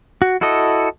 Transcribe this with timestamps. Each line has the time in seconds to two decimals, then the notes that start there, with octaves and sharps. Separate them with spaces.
0.22 F#4
0.41 E4 F#4 A4 D#5